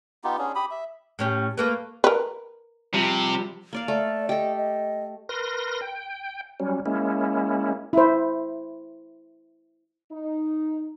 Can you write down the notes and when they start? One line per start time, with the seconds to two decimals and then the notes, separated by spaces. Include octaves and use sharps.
0.24 B3 D#4 F4 G4
0.38 C#4 D4 G#4
0.55 G4 B5 D#6
0.71 E5
1.19 A2 C#4 G4
1.58 A3 A#3 B4
2.04 A#4 B4
2.94 C3 F3 G3
3.73 A#3 D5 F5
3.88 A3 D5
4.29 G4 A4 D#5
4.57 D#5
5.29 A#4 B4 C6 A#6
5.82 G5
6.60 F#3 G3 C#4
6.86 G#3 A#3 C#4 E4
7.93 E4 C5
10.11 D#4